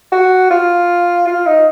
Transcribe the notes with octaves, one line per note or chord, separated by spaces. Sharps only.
F#4
F4
F4
D#4